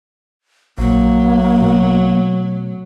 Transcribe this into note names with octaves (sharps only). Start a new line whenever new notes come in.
A#1 F#3 A#3
B2 A3